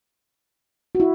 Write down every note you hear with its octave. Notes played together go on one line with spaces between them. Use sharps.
F#4
E4